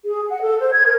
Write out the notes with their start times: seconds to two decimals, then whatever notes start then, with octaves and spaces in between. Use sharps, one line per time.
0.04 G#4
0.29 F#5
0.41 A4
0.59 C5
0.72 G#6
0.85 A#4